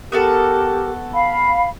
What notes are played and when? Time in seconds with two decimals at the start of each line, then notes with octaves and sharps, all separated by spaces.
0.12 B3 F#4 G4 A4 A#4
1.15 F5 B5